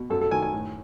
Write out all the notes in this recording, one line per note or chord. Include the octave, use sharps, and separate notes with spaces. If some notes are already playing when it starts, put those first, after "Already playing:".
Already playing: B2
F#2 A4
A4
D#3 G#5
G#5
A2